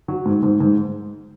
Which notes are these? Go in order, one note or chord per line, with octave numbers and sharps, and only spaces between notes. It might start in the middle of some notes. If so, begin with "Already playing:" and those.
F#3
G#2
G#2
G#2